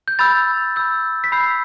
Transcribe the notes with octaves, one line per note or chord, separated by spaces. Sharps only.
G6
B5 E6 G6 A6
B5 E6 G6
B6
B5 E6 G6 C7